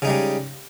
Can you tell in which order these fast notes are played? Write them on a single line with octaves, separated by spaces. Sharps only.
C#3 D#4 G3 G#3